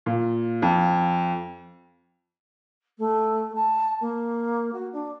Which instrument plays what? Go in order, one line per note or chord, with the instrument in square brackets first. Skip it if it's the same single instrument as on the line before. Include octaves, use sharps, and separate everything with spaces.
[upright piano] A#2
F2
[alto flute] A3
A5
A#3
F#4
D4